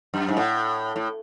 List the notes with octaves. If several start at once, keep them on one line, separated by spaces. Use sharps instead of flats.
F#2
G#2
A2
A2